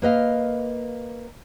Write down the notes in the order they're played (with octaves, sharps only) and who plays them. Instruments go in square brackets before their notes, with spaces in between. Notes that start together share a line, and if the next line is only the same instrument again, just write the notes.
[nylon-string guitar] A#3 B4 D#5 F5